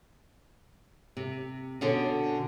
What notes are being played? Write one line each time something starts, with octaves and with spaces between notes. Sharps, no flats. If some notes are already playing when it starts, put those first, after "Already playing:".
C3
B2 D3 C#4